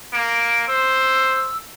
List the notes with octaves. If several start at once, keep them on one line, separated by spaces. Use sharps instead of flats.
A#3 D7
C5 E6